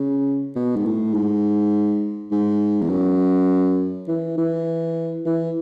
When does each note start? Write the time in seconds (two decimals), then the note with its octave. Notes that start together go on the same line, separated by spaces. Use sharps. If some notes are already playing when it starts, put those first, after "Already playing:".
Already playing: C#3
0.55 B2
0.76 G#2
0.85 A2
1.14 G#2
2.31 G#2
2.81 E2
2.90 F#2
4.08 E3
4.37 E3
5.25 E3